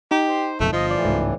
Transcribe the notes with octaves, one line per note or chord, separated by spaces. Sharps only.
D#4 G4
C5
F#1 B1 F2 A3
G1 F3 D#5
A2 E3 D5
C#2 G#2